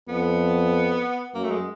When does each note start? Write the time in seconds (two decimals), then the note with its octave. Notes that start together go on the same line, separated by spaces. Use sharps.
0.08 F2 B3
1.35 F#2 A#3
1.44 A3
1.51 G#3